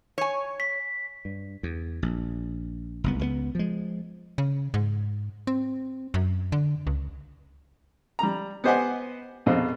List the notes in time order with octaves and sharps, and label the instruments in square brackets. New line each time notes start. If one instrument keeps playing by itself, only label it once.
[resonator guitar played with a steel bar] C#5 G#5
[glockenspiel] B6
[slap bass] G2
E2
A#1
F#1 C2 B3
C#2 A3 B3
F3 G#3
[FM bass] C#3
G#2
C4
F#2
D3
C#2
[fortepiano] G3 A#5
B3 G4 C5 D#5 F#5 G#5
A#1 F2 B2 C5 D#5